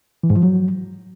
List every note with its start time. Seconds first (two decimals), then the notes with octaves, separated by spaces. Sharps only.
0.23 E3
0.30 G#2
0.36 F3
0.43 F#3